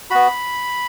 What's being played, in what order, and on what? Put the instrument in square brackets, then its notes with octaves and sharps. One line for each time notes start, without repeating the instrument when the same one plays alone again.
[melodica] B3 F#4 B5